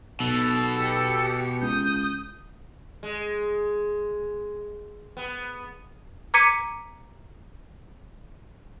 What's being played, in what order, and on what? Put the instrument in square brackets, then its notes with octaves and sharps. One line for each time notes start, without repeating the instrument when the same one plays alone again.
[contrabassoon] B1 [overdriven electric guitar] B2 [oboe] A4
[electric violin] G4 C#7
[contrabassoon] C#2 [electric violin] D#6 G6
[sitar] G#3
B3
[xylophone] A#5 D6 G#6 B6 C#7 D#7